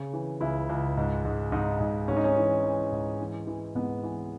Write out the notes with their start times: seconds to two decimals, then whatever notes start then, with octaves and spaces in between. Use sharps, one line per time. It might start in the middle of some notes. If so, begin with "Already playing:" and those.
Already playing: C#3
0.13 E3
0.41 C#2 E4
0.69 C#2
0.97 G#2
1.25 G#2
1.52 G#2 D#4
1.81 G#2
2.08 G#2 C#4
2.17 D#4
2.24 C#4
2.37 E3
2.64 E3
2.92 G#2
3.19 E3
3.47 E3
3.75 G#2 B3
4.03 E3